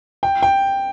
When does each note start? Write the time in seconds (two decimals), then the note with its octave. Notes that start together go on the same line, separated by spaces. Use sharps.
0.23 G5
0.43 G5